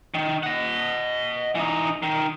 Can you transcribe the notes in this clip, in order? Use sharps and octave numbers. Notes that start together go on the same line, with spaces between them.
D#3
D#5 F#5
E3 D#4
D#3